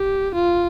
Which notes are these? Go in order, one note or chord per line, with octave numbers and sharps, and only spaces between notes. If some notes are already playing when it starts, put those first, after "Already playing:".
Already playing: G4
F4